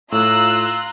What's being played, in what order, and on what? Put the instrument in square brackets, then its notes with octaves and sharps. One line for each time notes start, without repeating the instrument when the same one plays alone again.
[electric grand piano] A2 [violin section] F4 A#5 F#6 [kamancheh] E6